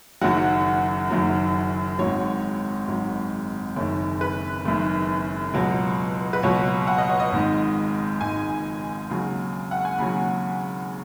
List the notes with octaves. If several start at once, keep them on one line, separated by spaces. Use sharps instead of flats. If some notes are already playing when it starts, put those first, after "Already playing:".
F#1 F#2 D#3 F#3 F#5
F#1 F#2 D#3 F#3
G#1 G#2 F#3 C#5
G#1 G#2 F#3
F#1 F#2 D#3 C#5
B4
F#1 F#2 D#3
C#2 B2 F#3
B4
C#2 B2 F#3 C#5
F#5
D#5
C#5
D#5
G#1 G#2 D#3
G#1 G#2 D#3 G#5
D#2 C#3 F#3
F#5
G#5
D#2 C#3 F#3 B5